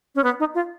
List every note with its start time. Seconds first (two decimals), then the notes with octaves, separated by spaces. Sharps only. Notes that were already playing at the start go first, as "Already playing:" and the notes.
0.15 C#4
0.24 B3
0.40 D#4
0.55 F4